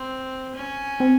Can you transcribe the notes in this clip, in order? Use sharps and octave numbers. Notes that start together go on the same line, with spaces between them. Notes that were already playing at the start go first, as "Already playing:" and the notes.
Already playing: C4
C#4
C4